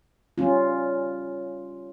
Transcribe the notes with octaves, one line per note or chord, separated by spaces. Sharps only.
G3 C#4 F4